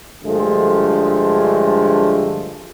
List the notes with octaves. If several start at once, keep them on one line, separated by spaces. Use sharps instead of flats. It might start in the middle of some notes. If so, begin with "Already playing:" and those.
G2 D3 F3 G#3 A3